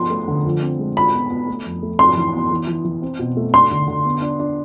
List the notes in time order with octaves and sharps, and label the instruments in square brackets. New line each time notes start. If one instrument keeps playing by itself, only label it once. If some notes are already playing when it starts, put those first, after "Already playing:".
Already playing: [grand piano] F3 B3 [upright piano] C6
[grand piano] A3
D3
F3
C4
G#3
[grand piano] F4 [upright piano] B5
[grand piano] B3
B3
A3
F2
A3
[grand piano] F2 [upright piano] C6
[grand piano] E3
B3
E3
E3
E3
C4
B2
A3
[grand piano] D4 [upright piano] C6
[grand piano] D3
D3
B3
D4
D4